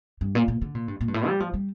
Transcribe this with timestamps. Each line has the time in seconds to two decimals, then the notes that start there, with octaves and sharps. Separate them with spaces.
0.21 G2
0.35 A#2
0.48 A#2
0.62 D3
0.75 A#2
0.88 G2
1.01 A#2
1.08 G2
1.14 A2
1.27 G3
1.40 F3
1.54 G3